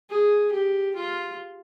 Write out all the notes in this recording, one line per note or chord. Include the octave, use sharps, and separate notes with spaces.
G#4
G4
F4